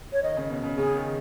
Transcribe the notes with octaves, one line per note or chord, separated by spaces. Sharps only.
C#5
D#3 D#5
C#3
B2
C#3
C#3 G#4
D#3